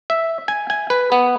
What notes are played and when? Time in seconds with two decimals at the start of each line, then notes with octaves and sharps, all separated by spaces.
0.10 E5
0.48 G#5
0.70 G#5
0.90 B4
1.12 B3